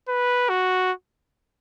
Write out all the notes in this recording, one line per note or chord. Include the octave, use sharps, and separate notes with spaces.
B4
F#4